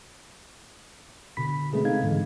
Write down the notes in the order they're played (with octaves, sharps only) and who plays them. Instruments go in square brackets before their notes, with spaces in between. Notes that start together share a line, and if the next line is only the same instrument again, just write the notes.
[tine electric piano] B2 D3 B5 B6
G#3 A3 C4 C#4 G#4 B4
C3 C4 D#4 A4 F5 G#6
G#2 D3 E3 G#3